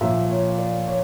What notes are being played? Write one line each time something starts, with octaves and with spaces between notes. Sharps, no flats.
A#2 F3 E5
C#5
D5
C#5